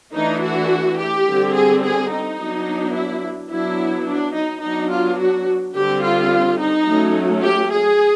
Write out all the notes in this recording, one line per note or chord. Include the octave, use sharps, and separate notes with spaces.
E3 A3 D4 D#4
F#4
G4
D3 G3 C4
G#4
G#4
D#4
F#3 B3 D4
E4
F#3 B3 D4 E4
D4
D#4
F#3 B3 D4 D#4
F4
F#4
D3 G3 C4 G4
F4
D#4
F#3 A3 C#4
G4
G#4